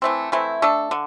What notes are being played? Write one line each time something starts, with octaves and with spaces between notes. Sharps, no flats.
E3 A3 C4
E3 A3 C4 E4
A3 D4 A4
D3